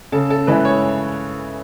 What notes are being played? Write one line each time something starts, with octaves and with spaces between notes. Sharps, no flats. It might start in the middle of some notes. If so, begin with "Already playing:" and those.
C#3 A4
A4
E3 G#3 B4
C#5